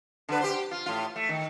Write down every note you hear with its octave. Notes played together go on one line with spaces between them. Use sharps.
D3 D4 B4
G4 C5
F4
A2 F4
A3
D#3